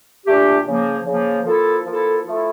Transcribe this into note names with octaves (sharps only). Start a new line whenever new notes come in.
A#2 A3 D4 G4
C#3 F3 A#3
C#3 F3 A#3
F3 A#3 E4 A4
F3 A#3 E4 A4
F3 A3 E4 A4